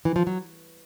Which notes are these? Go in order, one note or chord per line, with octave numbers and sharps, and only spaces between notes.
E3
F3
F#3